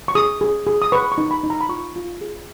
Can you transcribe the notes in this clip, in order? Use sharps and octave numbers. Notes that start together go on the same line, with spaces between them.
C#6
G#4 D#6
G#4
G#4
D#6
B4 C#6
C#6
D#4
B5
D#4
A#5
B5
F4 C#6
F4
G#4